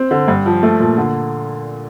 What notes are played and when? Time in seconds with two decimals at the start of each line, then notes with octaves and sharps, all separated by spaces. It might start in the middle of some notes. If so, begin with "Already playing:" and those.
Already playing: C4
0.11 D3
0.28 G2
0.46 F3
0.63 A3
0.80 A#2
0.98 D3